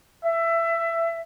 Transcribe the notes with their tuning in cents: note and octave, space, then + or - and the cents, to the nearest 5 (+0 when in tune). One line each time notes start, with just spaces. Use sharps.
E5 +20